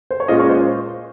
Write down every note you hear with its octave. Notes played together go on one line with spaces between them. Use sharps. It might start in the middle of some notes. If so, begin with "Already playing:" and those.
C5
C#5
A#2 G#3 C#4 F4 D#5
C#5
C5